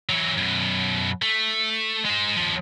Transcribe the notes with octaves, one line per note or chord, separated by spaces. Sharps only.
E3 F#3
F#2 B2
A3
G#3 C5
D#2 F3